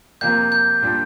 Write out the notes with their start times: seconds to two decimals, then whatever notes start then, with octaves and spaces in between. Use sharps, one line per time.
0.21 F2 C3 A#3 G6
0.52 G6
0.82 A#2 G3 D4